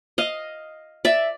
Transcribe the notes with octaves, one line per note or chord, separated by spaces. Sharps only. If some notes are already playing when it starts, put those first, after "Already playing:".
D#5 F5
D5 E5